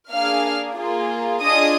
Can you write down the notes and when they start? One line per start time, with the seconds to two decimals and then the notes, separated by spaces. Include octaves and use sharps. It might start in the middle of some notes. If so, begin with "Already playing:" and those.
0.11 A#3 D4 G#4 F5 F6
0.77 A#3 F4 G#4
1.42 D4 F4 G#4 D#5 D#6